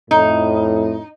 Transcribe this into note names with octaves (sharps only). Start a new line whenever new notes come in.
F2 A2 D#4